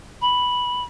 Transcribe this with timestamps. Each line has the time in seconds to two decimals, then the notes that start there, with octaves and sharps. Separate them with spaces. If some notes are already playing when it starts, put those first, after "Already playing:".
0.21 B5